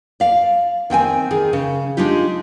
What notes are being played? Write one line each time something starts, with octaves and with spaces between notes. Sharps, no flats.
D5 F5
D#3 C4 G5 G#5
D#3 G#4
C#3
G#3 D4 D#4 F4 G4